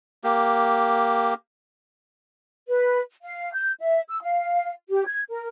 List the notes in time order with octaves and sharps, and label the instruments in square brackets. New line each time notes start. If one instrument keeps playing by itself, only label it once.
[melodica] A#3 G4
[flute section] B4
F5
G6
E5
E6
F5
G4
G#6
A#4